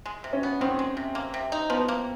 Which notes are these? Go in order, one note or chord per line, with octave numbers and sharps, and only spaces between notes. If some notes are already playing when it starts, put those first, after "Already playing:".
G#3
C3
C#4
B3
D#3 C4
G#3
C3
A#3
C3
D#4
F3 B3
A#3